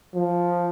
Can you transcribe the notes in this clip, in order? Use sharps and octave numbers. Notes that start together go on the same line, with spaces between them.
F3